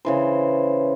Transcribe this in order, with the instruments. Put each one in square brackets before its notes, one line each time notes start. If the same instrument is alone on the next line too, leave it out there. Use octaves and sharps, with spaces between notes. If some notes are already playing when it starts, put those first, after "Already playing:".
[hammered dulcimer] C#3 E3 C5